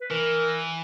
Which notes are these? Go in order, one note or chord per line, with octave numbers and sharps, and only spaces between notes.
B4
E3 A#4